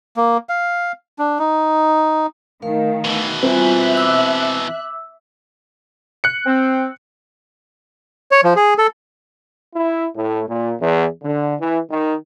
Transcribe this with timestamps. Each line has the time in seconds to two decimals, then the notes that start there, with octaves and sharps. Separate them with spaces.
0.17 A#3
0.49 F5
1.19 D4
1.39 D#4
2.62 D#3 A3 A#4 F5
3.04 B2 E3
3.43 G3 C4 F4 E5 G#5 F#6
3.97 D6 E6
6.24 F#6 C#7
6.46 C4
8.31 C#5
8.44 F3
8.56 G#4
8.78 A4
9.75 E4
10.16 A2
10.49 A#2
10.81 E2
11.24 D3
11.60 E3
11.91 D#3